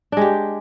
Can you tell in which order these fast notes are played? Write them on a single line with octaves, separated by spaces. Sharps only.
D4 G#3 G4